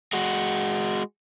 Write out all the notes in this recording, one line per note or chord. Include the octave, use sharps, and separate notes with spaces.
G#3 F#4